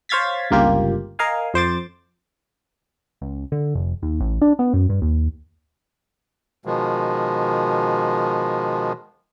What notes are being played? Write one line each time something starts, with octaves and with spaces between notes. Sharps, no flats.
C5 C#5 F5 G#6 A6 B6
G1 C#2 A#3 F4 G4
A#4 D#5 F5 G#5
F2 C5 D6 A6
C#2
D3
F1
D#2
A1
D4
B3
F#2
G2
D#2
B2 D#3 F3 G#3